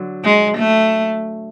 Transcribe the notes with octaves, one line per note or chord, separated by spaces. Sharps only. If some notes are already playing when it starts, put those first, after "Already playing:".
Already playing: D3 F#3
G#3
A3